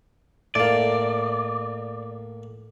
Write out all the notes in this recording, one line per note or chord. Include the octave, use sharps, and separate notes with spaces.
A2 A#3 D5